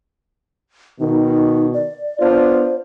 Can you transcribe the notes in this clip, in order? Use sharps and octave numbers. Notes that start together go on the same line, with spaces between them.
B2 D#3 D#4
D5
B3 D4 F4 C5